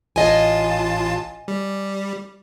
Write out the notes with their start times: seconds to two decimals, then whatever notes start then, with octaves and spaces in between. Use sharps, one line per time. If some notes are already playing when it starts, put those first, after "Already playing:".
0.16 A1 F4 D#5 G#5 A5
1.48 G3